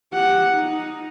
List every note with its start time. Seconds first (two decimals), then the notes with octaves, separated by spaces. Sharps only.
0.13 G4 F#5
0.53 D#4